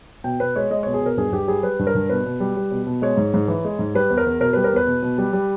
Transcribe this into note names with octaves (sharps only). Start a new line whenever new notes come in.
B2 G5
B2 B4
G#3 C#5
G#3 D#5
B2 C#5
G#4
B2 A#4
G2 G#4
G2 G4
G3 G#4
G3 B4
G2
A#4
G2
B2 B4
B2
G3
G3
B2
B2
G#3 C#5
G#2
G#2
E3
G#3
G#2
G3 B4
E2
A#4
E2
B2 A#4
G3 B4
A#4
E2 B4
B2
B2
G3
G3